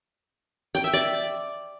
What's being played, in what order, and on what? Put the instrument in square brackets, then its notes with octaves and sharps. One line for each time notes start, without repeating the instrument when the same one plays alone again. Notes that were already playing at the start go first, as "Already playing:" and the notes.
[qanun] G5
E5
D5